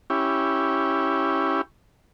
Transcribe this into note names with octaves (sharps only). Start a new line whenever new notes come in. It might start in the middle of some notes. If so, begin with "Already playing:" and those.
C#4 E4 G4